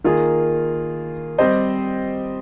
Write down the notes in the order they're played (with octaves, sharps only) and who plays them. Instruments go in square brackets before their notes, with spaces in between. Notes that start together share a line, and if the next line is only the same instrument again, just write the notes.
[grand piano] D#3 A#3 F4 G#4
G3 C4 G4 C5 D#5